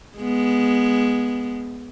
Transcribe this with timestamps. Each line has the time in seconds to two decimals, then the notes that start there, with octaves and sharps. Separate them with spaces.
0.18 G#3 B3